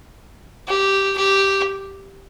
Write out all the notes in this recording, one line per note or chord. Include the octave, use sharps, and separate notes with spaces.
G4
G4